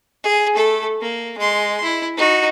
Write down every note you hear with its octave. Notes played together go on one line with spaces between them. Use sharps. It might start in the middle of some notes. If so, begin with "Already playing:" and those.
G#4
A3 A4
A#3
G#3 C6
E4
D#4 F#4